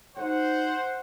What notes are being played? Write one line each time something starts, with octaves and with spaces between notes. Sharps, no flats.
D#4 F#4 C5 F#5